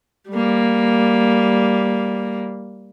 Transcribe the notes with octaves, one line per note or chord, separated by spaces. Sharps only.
G3 A#3